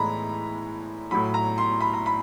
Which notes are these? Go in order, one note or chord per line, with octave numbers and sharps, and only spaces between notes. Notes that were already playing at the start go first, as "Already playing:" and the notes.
Already playing: A2 E3 G#3 A#5 B5
A2 F#3 B5
A#5
C6
B5
A#5
B5